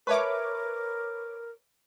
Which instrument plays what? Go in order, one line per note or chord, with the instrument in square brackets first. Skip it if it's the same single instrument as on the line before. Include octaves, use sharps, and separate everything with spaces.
[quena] A#4 [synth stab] B4 C#5 D6 [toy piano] E5 A5 C#6